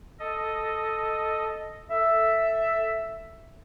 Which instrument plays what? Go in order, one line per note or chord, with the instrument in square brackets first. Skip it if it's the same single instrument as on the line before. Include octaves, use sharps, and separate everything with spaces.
[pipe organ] A4 D#5
[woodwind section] A4 E5